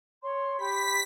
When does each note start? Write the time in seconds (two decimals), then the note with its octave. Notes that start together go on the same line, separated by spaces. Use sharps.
0.23 C#5 C6
0.58 G4 B5 B6